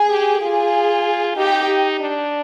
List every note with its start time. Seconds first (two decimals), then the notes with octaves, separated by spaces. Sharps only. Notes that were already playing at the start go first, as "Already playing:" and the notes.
Already playing: G#4
0.09 G4
0.40 F4 G#4
1.36 D#4 G4
2.00 D4